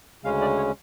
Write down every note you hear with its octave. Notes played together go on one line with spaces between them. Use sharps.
D2 C#3 G#3 C#4 F5
D5
C#5